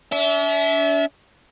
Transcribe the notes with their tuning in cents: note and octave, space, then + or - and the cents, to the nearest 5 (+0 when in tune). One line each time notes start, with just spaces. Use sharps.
D4 -45 E5 -15